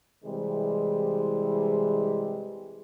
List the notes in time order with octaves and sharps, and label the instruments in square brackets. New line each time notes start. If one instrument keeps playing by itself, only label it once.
[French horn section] C3 E3 G3 G#3